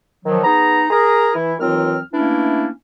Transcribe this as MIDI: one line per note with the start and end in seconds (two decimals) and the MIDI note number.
0.25 0.42 51
0.25 0.42 53
0.25 0.42 54
0.43 0.84 59
0.43 0.84 63
0.43 0.84 68
0.43 0.84 82
0.90 1.29 68
0.90 1.29 70
0.90 1.29 82
1.35 1.54 52
1.35 1.54 64
1.59 1.97 39
1.59 1.97 52
1.59 1.97 54
1.59 1.97 60
1.59 1.97 65
1.59 1.97 89
2.13 2.67 52
2.13 2.67 57
2.13 2.67 58
2.13 2.67 61
2.13 2.67 62
2.13 2.67 64